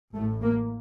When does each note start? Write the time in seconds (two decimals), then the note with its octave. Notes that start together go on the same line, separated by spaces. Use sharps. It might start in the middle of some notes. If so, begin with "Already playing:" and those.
0.14 A1 A2 A3
0.43 A#3